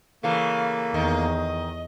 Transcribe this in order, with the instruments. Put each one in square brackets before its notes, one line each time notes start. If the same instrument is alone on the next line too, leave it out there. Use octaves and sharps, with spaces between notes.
[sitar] C#3 E3 A3 [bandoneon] A#3 [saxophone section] F5
[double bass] E2 [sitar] D#3 [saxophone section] D#5